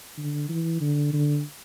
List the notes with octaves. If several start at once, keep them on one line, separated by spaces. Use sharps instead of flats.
D3
E3
D3
D3